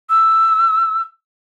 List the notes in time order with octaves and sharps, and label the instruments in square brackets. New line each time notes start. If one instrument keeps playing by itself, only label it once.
[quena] E6